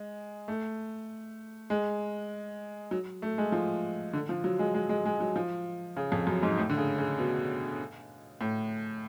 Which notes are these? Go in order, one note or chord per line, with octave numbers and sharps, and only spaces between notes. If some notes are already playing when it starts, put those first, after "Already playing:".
Already playing: G#3
A3
G#3
F#3
A3
G#3
F3
D3
F3
F#3
G#3
G#3
G#3
G#3
F#3
F3
C#3
F2
F#2
G#2
A2
D3
C#3
C#3
B2
A2